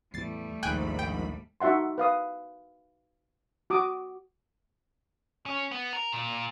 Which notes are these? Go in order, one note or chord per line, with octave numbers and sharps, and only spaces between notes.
E2 A2 E3 G3 A3 A6 C7
D#1 A#1 D#2 G#2 G5 G#5 B5 F#6
G5
D#4 F#4 E5 F#5 C6
B4 F5 D#6
F#4 D6 D#6
C#4
B3
A#4
A#2